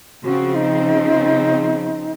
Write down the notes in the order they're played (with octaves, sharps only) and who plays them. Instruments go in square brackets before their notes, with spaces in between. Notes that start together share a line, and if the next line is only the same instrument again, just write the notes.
[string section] C#3 F3 C4 [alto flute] F#4
[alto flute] D#4